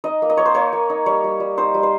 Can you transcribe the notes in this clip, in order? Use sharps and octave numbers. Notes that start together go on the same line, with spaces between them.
D#4 D#5
A#3
D#5
A#3 C#5
C5
A#3 C#5
A#3
D#4
G3 C#5
G3
G3
D#4 C5
G3
C5